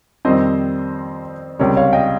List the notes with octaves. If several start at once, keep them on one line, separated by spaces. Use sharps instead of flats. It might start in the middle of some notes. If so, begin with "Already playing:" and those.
F2 D#3 G3 C4 C5 D#5
C#2 C3 G3 A#4 C#5
C#5 F5
D#5 G5